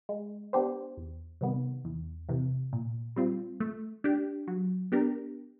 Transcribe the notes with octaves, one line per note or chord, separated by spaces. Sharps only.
G#3
B3 D4 G4 C5
E2
C3 D#3 G3 B3
E2
C3 E3
A#2
G3 C4 F4
A3
D4 G4
F#3
B3 D4 G4 A#4